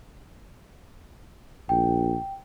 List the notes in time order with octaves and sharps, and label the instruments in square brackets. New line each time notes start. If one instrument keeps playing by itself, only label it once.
[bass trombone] A#1 [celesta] G5